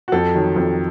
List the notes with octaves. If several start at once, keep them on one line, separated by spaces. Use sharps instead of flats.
F#4
F2 A4
D#3 F#3
F2